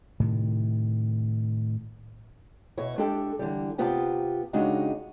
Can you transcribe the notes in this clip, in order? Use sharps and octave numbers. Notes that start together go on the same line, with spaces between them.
A2 C3 D#3
B2 E4 B4 C#5
G#3 D4 E4 G4 A4 G5
D3 E3 G3
C3 B3 F4 G4 A5
C#3 G#3 D4 D#4 F#4 G4